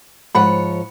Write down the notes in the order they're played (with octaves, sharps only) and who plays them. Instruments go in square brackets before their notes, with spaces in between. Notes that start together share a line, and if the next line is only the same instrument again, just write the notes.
[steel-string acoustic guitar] G#2 F3 C#5 [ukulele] F#5 B5